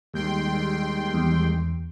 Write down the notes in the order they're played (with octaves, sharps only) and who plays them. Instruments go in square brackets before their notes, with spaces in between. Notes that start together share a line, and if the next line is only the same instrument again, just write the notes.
[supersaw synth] D#2 G5 C6 [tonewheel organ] D#3 G3 G#3
[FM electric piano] E2